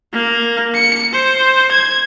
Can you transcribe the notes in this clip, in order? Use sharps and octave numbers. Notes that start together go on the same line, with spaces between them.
A#3
C#7
C5
G#6